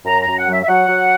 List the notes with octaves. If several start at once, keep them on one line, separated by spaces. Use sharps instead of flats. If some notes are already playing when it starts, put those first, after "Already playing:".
F#2 A#5
A#5
F#2
F#5
F#3 E5
E5
F#3 F#5
F#3